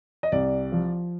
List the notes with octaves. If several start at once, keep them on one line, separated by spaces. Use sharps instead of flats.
D#5
C2 D5
F3